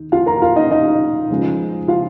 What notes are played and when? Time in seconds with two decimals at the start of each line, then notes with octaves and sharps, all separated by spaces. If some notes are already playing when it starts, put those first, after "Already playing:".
Already playing: D#2 D#4
0.12 F4 F5
0.26 A#4 A#5
0.42 F4 F5
0.56 D#4 D#5
0.71 D#4 D#5
1.30 C#2 C#3 F3 G#3
1.88 F4 F5